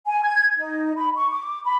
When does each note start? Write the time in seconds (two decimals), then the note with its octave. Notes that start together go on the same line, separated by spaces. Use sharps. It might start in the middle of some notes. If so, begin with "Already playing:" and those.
0.06 G#5
0.24 G#6
0.57 D#4
0.97 B5
1.16 C#6
1.30 D6
1.65 B5